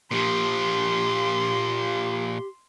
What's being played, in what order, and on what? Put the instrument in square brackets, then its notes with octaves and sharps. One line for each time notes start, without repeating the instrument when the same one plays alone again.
[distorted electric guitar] A#2 F3 [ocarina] G4 [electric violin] C6